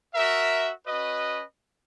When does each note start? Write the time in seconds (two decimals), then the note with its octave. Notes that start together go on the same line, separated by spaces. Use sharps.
0.15 F#4 A#4 E5
0.86 C#4 F#4 B4 D#5